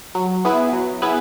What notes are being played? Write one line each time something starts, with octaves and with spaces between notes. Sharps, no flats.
F#3
B3 E4 G#4 B4
F#3
B3 E4 G#4 B4